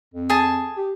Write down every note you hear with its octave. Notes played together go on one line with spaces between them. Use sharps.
F2
G#4 A5
G4